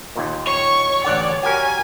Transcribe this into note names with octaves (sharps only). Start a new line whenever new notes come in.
D#2 A#2
C#5 C#6
A1 D3 D5 F#5
F#4 G4 A#4 G#5